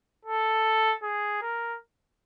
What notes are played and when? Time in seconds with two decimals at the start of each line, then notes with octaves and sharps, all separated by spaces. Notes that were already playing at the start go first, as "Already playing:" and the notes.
0.25 A4
1.03 G#4
1.42 A#4